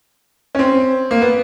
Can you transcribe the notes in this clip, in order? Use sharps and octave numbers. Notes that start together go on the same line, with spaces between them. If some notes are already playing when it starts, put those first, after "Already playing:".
C#4
C4
A#3
B3